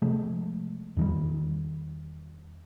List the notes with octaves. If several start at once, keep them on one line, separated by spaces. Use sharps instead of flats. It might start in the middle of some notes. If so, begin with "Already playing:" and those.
C3 F3 G#3 A3
E2 D#3 G3